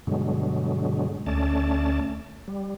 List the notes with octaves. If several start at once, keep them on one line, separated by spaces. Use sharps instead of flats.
G2 B2 D3 F#3 G#3
D2 A3 C#4 D5 A5
G3